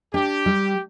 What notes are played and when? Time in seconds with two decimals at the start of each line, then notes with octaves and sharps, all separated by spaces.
0.13 D4 G4
0.46 G3